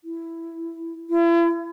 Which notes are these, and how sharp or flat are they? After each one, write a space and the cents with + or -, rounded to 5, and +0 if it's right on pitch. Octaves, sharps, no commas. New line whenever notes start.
E4 +10
E4 +40